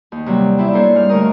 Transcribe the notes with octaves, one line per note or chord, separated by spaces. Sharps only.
D#2
C3 F#3 G3 A#3
B3 C4 E4 D5 E5
A#3 D4 A4 C5 C#5
G#2 G3 F6
D2 C#3 A3 A#4 D#5